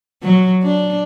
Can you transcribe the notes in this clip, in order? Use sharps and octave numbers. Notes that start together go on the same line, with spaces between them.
F#3
D4